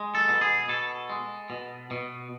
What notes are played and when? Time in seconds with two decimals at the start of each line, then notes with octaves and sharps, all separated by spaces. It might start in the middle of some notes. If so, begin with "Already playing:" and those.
Already playing: G#3
0.15 A4
0.28 B2
0.41 G#4
0.69 B2 A4
1.10 G#3
1.50 B2
1.91 B2